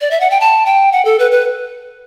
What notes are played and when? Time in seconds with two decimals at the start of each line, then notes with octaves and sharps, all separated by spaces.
0.01 D5
0.11 E5
0.20 F#5
0.30 G5
0.40 A5
0.66 G5
0.92 F#5
1.05 A4
1.19 B4
1.32 B4